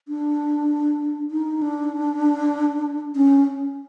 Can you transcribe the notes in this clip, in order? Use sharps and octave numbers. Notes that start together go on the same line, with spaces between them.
D4
D#4
D4
C#4